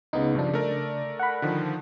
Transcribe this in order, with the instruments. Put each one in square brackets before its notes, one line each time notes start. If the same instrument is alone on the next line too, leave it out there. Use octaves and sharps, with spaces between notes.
[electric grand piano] C#2 [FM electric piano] C#3 B3 D#4
[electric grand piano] G2 F3 [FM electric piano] C#3 D4
[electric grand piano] A3 A#4 D5
[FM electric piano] F#5 B5
[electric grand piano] D3 D#3 F3